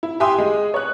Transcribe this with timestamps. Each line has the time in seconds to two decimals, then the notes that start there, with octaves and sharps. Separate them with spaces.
0.03 E4
0.20 G4 E5 G#5 C6 D#6
0.38 G#3
0.74 C#5 F#6